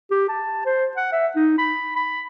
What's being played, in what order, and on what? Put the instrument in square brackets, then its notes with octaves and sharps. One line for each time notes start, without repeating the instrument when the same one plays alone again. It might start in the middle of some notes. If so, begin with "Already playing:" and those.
[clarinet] G4
A5
C5
F#5
E5
D#4
B5
B5